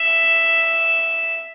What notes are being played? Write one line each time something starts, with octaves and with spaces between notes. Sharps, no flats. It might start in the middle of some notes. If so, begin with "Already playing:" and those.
Already playing: E5